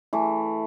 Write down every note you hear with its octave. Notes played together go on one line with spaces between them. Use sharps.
E3 A3